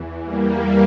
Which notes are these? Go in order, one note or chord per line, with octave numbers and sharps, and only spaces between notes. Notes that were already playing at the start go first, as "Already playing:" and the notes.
Already playing: E2 E3
G3 A#3